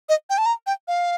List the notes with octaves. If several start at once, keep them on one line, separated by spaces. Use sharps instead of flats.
D#5
G5
A5
A#5
G5
F5